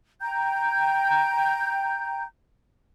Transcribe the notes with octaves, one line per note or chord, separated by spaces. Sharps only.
G5 A#5 G6